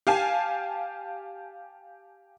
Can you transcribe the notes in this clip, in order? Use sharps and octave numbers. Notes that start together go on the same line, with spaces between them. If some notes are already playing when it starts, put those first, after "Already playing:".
G4 F5 G#5 A5